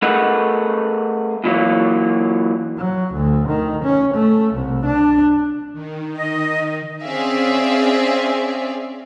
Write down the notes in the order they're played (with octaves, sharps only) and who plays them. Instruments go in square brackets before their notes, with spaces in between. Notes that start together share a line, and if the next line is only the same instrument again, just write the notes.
[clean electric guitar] A3 G#4 A#4 B4 D#5 F#5
A#2 E3 F#3 A#3
[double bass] F#3
D2
D#3
C#4
A3
C2
D4
[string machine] D#3
[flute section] D#5
[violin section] C4 C#4 G#4 D5 E5 F5